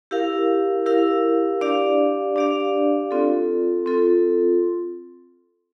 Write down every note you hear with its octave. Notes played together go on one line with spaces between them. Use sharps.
E4 G4 A#4 F5
E4 G4 A#4 F5
D4 G4 D5 F5
D4 G4 D5 F5
C4 F4 A4
C4 F4 A4